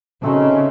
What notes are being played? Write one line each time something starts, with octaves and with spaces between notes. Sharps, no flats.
C#3 A3 C4 D#4 F#4